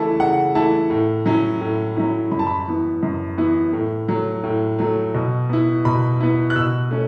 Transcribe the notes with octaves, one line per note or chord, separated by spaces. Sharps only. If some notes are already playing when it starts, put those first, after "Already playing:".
Already playing: C#3 E3 A3 E4 A5
C#3 F#5
E3 A3 E4 A5
A2
F#3 C#4 E4
A2
F#3 C#4 E4
F#2 B5
A5
B5
E3 B3 E4
F#2
E3 B3 E4
A2
F#3 A3
A2
F#3 A3
B2
B3 E4
B2 B5
B3 E4
F#6
B2 E6
A3 C#4